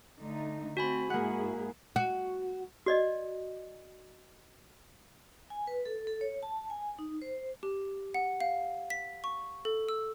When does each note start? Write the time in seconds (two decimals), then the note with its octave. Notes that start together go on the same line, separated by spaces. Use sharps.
0.19 D3 A3 D#4
0.77 A3 C4 F#4 G#5 B5
1.10 G#2 A#3 E4 G#4 F#5
1.96 F#4
2.86 F#4 D5 D#5
5.50 G#5
5.67 B4
5.86 A4
6.07 A4
6.21 C#5
6.43 A5
6.70 G#5
6.99 D#4
7.22 C5
7.63 G4
8.14 F#5
8.41 F5
8.90 B6
9.24 C#6
9.65 A4
9.89 E6